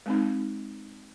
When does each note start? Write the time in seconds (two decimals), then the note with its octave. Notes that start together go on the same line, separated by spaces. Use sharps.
0.06 G#3 C4 D#4